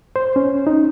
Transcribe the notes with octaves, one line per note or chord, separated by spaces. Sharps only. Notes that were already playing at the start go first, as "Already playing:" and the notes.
C5
C#4
D#4